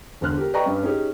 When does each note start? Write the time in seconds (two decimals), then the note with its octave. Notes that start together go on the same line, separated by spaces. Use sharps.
0.21 E1 D3 C5 F6 F#6
0.37 G4 A#4
0.54 B4 D5 D#5 G5 A#5 C#6
0.66 G2 C#4 B4
0.83 C#4 D#4 G4 G#4 C#5